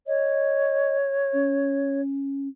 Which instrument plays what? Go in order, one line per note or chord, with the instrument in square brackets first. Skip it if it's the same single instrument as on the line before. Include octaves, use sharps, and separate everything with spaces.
[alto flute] C#5 [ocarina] D#5
[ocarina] C#4